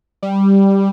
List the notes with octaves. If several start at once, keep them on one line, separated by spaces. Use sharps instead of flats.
G3